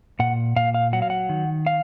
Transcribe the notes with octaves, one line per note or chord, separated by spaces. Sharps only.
A#2 F#5
A#2 F5
F5
F#3 F#5
F5
F#5
D#3
F5